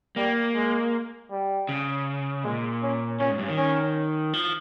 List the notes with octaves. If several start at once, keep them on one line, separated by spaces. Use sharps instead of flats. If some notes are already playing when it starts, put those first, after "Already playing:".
G3 A#3
G#3
G3
C#3
A#2 G#3
C#4
A#2 C#4
G#2
G2
D#3
C#4
F3